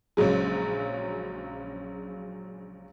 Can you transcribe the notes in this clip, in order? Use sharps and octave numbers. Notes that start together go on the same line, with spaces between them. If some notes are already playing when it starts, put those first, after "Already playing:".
A#1 C#3 F#3 G#3